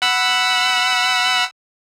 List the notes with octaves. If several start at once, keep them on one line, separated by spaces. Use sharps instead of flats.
F#5 B5 E6